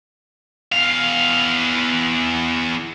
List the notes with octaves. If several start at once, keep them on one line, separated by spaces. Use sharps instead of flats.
E2 F5